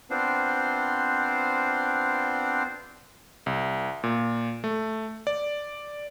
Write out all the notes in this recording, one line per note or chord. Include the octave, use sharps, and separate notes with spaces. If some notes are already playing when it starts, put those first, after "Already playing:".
B3 C4 D4 F4 C5
C2
A#2
A3
D5